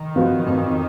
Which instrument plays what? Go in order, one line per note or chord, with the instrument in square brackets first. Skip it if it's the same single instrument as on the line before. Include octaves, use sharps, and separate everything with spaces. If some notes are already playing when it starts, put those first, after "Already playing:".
Already playing: [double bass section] D#3
[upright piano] F3 B3 F#4
F2